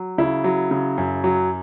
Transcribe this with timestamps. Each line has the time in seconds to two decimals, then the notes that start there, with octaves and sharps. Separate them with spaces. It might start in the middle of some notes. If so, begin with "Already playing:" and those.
Already playing: F#3
0.18 C#3 E4
0.44 F#3
0.71 C#3
0.98 F#2
1.24 F#3